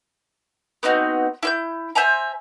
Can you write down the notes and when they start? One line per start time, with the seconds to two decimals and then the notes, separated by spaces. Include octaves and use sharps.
0.83 B3 C4 D#4 F#4
1.43 E4 E6 G6
1.95 C5 E5 G#5 A#5